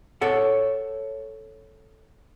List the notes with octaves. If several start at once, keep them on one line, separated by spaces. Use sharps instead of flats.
A4 C#5 F#5